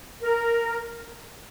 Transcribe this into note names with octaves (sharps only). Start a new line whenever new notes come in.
A#4